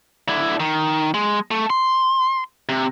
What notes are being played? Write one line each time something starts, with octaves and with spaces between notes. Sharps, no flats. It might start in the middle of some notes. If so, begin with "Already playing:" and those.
D3 E4
D#3
G#3
A3
C6
C3